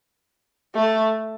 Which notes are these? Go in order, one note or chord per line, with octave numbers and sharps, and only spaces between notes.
A3